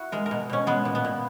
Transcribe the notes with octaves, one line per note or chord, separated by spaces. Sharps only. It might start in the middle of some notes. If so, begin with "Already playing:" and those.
Already playing: E4 F#4
G#3 A#4
A#4
B2
B2 C#4
G#3 B3
A#2
B3
A#2